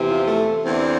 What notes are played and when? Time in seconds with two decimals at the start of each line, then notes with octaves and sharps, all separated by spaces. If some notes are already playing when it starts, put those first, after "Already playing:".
Already playing: E2 C3 E3
0.09 F3
0.28 A3
0.64 E2 D3 C4